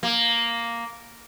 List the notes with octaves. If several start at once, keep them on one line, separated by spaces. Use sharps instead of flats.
A#3